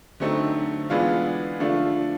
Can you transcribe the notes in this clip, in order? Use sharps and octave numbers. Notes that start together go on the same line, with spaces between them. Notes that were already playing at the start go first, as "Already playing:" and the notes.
D3 F#3 A3 C4 D#4
E3 G#3 B3 D4 F4
D3 F3 A3 D4 F4